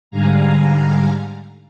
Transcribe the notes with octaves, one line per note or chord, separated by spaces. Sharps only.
G#2 D3 G3 F5 G#5 A#5